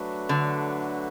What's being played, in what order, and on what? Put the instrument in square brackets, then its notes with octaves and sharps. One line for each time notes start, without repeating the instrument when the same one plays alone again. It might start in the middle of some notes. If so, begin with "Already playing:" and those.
Already playing: [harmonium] F#3 A3 D4 F#4 B4
[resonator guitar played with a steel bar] D3